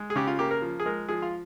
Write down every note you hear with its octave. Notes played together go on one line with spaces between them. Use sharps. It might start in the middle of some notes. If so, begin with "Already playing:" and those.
Already playing: G#3
G#4
C#3 G4
F4
A#3 G4
A#4
F3
G#4
G#3 A#4
F3 G#4
F4